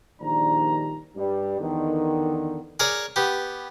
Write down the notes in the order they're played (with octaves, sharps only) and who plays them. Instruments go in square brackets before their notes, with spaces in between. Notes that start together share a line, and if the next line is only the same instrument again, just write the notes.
[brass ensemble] A#1 D#3 G3 D4 A#5
G2 G3
E2 D3 D#3
[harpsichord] G#4 A#4 C#5 D5
B3 G4